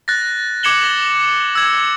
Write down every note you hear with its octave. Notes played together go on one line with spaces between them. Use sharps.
F#6 A6 A#6
D6 G#6 C#7 E7 F#7 G7
A#6
E6 G#6 F#7